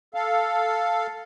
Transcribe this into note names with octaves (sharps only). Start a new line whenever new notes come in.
A4 F5